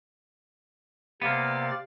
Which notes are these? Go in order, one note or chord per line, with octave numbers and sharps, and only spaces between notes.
C3 A#3 B3 D5 F5 A6